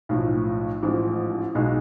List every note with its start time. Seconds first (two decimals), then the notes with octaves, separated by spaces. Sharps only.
0.09 B1 A2 F3
0.82 A1 G#2 F3
1.55 B1 B2 G#3